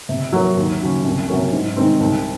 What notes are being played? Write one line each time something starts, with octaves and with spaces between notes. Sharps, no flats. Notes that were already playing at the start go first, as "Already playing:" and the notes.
C3
F#3 A#3
D#2
C#3 F#3 C#4
C2
C3 F#3 A#3 C#4
G#2
D#3 G#3 C4 D#4
C2